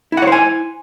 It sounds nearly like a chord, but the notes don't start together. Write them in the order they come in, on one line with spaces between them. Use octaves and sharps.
E4 F#5 C#5 C5 G#5